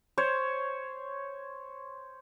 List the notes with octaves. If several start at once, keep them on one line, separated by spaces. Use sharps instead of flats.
C5 C#5